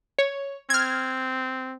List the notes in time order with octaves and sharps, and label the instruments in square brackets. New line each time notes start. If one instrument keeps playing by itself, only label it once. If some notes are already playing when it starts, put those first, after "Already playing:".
[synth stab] C#5
[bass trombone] C4 [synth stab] F6 G#6